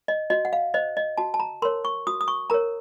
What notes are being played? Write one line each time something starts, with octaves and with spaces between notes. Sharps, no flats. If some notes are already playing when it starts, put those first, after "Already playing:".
D#5
F#4 D#5
F#5
F5
C5 D#5
D#5
F#4 A5
A5
A#5
A#4 C#5 C6
C#6
F#4 D#6
D#6
C#6
A#4 C#5 A#5